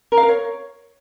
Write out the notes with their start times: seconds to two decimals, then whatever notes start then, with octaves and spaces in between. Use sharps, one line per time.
0.12 A#4
0.17 F5
0.23 A#4
0.28 C#5